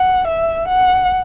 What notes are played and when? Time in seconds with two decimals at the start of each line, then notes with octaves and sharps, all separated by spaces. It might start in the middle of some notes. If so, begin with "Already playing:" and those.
Already playing: F#5
0.28 E5
0.68 F#5